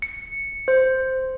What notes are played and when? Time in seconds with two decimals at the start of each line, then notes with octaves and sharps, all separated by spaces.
0.02 C#7
0.68 C5